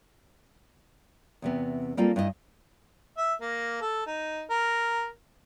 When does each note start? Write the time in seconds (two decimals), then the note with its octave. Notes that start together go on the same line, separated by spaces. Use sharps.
1.42 E2 C3 B3
1.97 G3 A#3 C4 F4 A4
2.16 G2 D4 E4 G#4 D#5
3.17 E5
3.41 A#3
3.82 A4
4.06 D#4
4.50 A#4